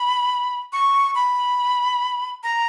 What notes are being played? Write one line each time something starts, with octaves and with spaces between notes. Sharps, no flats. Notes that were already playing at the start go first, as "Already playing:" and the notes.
Already playing: B5
C#6
B5
A#5